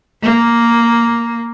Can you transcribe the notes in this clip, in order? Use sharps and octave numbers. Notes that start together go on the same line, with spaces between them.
A#3